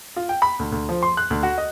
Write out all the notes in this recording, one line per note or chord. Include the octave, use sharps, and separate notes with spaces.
F4
G5
B5
D2
D2
F3
C6
F#6
D2
F#4
D#5